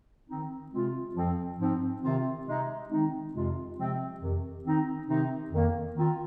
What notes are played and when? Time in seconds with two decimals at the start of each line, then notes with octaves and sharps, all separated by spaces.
0.28 D#3 C4 D#4
0.72 C3 G#3 C4 F4
1.15 F2 F3 C4
1.59 G#2 F3 C4
2.03 C3 D#3 C4 F4
2.47 C3 G#3 D#4
2.89 D#3 G#3 C4 D#4
3.34 F2 C3 G#3 F4
3.77 C3 F3 G#3 C4
4.21 F2 C3 D#3
4.64 D#3 C4 D#4
5.07 C3 D#3 C4 D#4
5.51 F2 D#3 A#3
5.94 D#3 C4 F4